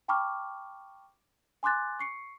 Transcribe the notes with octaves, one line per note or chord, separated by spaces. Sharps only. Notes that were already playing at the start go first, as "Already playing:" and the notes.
G5 A5 B5 C#6 D6 F6
G#5 C6 D6 F#6 A6
C#6 C7 C#7